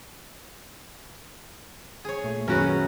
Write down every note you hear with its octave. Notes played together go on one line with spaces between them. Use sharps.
G#4 C#5
A#2 A3
F#2 D#3 C#4 F#4 G#4 A#4 B4 C#5